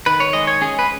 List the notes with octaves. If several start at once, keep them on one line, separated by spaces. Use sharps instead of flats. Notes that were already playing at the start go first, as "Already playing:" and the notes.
D#3 B4
C#5
G#3 D#5
C#5
C#4 G#4
B4